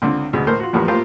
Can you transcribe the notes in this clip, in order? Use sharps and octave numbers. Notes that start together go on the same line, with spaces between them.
C#2 D3 C4
D2 B2 G#3
A2 A#4 C5
F4 F#4
E2 A2 F3 G3 A#3 B3
A2 A#3 F4 G4 C5